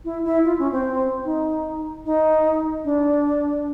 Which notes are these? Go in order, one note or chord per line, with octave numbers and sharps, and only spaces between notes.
E4
E4
F4
C#4
C4
D#4
D#4
D4